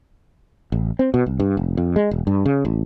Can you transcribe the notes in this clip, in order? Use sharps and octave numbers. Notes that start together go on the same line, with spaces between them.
A1
C4
B2
C2
G2
F1
F2
G#3
E1
G2
C#3
A1